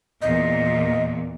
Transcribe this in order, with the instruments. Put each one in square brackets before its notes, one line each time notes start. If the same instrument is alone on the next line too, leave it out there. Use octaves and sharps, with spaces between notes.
[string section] E2 A#2 [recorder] D#5